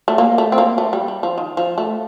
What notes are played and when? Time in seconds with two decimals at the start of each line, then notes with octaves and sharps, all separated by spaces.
0.08 A3
0.18 A#3
0.38 A3
0.52 C4
0.58 A#3
0.78 A3
0.93 G3
1.08 G3
1.23 F3
1.38 D#3
1.57 F3
1.78 A3